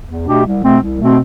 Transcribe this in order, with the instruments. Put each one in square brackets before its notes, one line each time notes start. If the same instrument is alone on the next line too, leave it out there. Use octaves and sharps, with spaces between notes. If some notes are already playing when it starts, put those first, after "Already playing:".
[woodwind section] E2
B2 A3 D4 G4
C2
B2 A3 C4
C2
B2 A3 C4